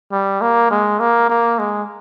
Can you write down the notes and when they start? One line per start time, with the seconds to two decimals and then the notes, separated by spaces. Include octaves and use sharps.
0.12 G3
0.42 A#3
0.71 G#3
1.00 A#3
1.30 A#3
1.59 G#3